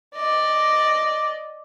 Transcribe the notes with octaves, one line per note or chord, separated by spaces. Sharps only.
D5 D#5